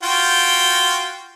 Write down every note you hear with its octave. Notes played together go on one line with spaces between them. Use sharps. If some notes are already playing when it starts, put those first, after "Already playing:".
F4 F#4 G5